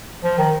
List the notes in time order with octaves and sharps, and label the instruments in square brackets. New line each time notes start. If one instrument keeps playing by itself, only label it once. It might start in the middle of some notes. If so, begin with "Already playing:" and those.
[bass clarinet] F3
D#3